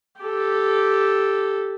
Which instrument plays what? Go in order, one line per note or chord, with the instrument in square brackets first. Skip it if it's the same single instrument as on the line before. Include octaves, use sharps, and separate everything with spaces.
[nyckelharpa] G4 A4